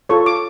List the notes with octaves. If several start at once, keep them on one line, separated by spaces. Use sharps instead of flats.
F4 A4 C#5 C#6
D6